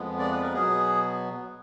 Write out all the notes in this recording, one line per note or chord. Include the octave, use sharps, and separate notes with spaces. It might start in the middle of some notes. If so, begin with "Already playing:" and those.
Already playing: F2 F3 G#3 B3
D5
B4
A#4
B2 F#3 B3 G#4